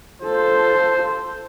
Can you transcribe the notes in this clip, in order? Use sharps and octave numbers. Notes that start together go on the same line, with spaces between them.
F4 A4 C5